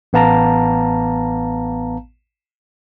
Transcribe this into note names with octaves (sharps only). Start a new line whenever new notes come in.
A1 B3 F5 A5 A#5